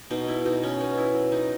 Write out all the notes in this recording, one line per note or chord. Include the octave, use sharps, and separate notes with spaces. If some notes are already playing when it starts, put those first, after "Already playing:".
B2 D#4
E4
B2 D#4
C#4
B3 D#4
E4
F#3
D#4